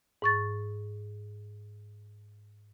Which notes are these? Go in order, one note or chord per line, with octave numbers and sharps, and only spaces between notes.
G#2 C#6 A6